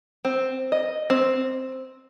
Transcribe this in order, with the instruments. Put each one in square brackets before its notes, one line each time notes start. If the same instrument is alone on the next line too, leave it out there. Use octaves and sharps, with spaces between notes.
[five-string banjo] C4
D#5
C4